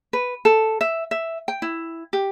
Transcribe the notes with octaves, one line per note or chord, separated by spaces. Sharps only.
B4
A4
E5
E5
G5
E4
G4